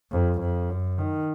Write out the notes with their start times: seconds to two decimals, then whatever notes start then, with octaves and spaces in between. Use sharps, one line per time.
0.12 F2
0.40 F2
0.70 F#2
0.98 D#3